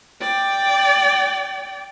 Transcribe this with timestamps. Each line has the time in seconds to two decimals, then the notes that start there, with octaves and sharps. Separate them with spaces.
0.21 D5 G5